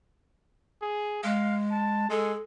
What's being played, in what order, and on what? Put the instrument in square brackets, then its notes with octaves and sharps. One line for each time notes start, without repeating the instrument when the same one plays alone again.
[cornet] G#4
[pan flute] G#3 [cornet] F5
[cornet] A5
[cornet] G#3 [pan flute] A4